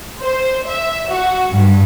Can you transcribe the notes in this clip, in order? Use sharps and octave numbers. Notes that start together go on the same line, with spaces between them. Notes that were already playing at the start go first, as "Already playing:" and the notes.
C5
E5
F#4
G2